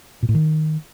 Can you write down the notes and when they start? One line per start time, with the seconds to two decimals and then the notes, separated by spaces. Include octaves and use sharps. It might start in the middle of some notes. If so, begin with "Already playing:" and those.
0.23 A#2
0.29 A2
0.35 D#3